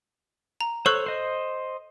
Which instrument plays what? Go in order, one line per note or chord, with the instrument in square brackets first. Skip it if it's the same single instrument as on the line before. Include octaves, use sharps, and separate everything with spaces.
[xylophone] A#5
[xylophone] A4 C#6 E6 [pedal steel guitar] C5 C#5 F#6
[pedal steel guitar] C5 D#5